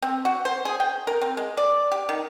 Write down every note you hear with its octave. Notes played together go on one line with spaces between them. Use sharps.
C4
F#4
C5
G#4
G5
A#4
C4
G#3
D5
G4
D#3